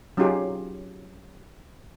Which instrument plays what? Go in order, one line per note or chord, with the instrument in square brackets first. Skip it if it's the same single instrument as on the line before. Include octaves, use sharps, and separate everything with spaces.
[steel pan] F#3 C#4 D#4 F4 G4 G#4